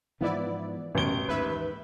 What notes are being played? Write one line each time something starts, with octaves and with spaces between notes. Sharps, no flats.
G#2 E3 F3 B3 E4 D5
A1 F#2 B2 C#4 D7 G7
D#2 G#2 B4 E5